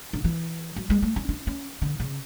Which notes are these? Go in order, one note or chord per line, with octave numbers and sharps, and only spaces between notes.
D3
E3
F#3
G#3
A3
C#4
D4
C#4
D3
C#3